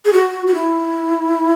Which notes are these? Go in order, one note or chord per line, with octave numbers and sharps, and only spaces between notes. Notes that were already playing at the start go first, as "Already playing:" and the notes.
G#4
F#4
F#4
E4